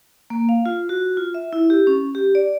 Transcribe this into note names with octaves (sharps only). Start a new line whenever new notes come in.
A#3
F5
F4
F#4
F4
E5
E4
G4
C#4
G4
D5